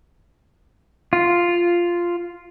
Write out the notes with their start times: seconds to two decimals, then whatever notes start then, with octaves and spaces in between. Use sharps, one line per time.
1.13 F4